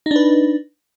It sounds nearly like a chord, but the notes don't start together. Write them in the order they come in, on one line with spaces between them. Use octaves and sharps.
D#4 D4 B4